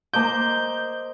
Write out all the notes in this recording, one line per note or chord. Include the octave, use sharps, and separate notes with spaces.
A#3 C5 D#5 A#5 D6 G6